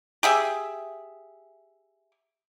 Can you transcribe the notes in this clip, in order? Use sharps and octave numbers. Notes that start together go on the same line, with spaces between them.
G4 G#4 E5